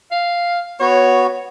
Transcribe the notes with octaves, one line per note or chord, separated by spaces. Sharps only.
F5
B3 F#4 C#5